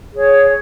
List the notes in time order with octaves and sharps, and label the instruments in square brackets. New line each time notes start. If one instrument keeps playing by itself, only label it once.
[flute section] G#4 C#5